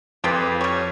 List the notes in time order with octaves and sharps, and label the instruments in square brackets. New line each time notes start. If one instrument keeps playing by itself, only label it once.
[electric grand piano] F2 B4 [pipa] G#3 F4 G4
[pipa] G3 C#5